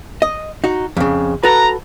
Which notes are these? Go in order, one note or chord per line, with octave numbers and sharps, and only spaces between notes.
D#5
D#4 F#4
F2 C#3
F#4 A4 B4 A#5